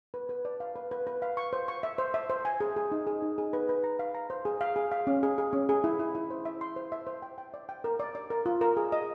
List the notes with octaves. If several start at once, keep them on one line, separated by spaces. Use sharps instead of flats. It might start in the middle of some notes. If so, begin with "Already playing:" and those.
B4
B4
D5
F5
B4
B4
B4
F5
C#6
C5
C#6
E5
C5
E5
C5
G#5
G#4
G#4
D#4
G#4
D#4
G#4
B4
B4
A#5
F5
A#5
C5
G#4
F5
G#4
F5
C#4
G#4
G#4
C#4
G#4
E4
E4
E4
C5
E5
C6
C5
E5
C5
G5
G5
D5
G5
A#4
D5
D5
A#4
F4
A#4
G#4
D#5